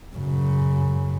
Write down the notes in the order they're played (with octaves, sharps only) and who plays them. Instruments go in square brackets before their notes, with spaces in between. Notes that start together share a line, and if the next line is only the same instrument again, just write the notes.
[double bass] F#2 C#3